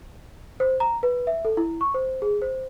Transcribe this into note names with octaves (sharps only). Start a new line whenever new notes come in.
C5
A#5
B4
E5
A4
E4
C#6
C5
G#4
C5